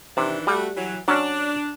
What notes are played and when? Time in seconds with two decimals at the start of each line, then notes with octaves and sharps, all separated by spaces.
0.17 C3 D#3 E3 D4
0.47 G3 A3 F#4
0.76 E3 F#3
1.08 F#3 C#4 D4